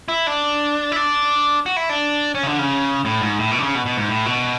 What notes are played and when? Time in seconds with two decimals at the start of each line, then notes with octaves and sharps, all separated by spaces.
0.08 E4
0.27 D4
0.92 E4
0.96 D4
1.66 F#4
1.77 E4
1.89 D4
2.35 C#4
2.43 C#3
2.47 D3
2.59 C#3
3.05 A2
3.22 G#2
3.39 A2
3.51 B2
3.58 D3
3.63 C#3
3.75 B2
3.86 B2
3.97 G#2
4.09 A2
4.26 B2